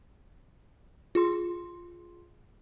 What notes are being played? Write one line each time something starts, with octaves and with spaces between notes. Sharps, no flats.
F4 G#4 C6